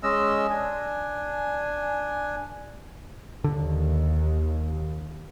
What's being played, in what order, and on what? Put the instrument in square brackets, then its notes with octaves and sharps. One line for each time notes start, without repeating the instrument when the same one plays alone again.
[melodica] G#3 C#4 D#5 E6
D4 G#5
[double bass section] D#2 [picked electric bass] D3